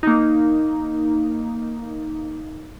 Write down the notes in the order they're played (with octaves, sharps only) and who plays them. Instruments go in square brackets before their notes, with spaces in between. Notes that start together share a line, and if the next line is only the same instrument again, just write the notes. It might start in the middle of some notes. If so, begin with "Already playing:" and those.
[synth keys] A#3 D#4